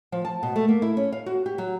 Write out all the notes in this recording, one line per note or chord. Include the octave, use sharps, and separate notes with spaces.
F3
A5
B2
A3
A#3
E4
C#4
F5
F#4
G4
F#3